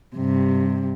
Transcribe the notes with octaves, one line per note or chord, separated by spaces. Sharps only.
G2 C3